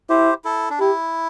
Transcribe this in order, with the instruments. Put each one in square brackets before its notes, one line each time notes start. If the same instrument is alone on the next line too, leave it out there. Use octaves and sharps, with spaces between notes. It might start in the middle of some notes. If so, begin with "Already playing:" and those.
[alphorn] E4 [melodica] G4 C5
[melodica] E4 A4
D4
[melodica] E4 [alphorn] G4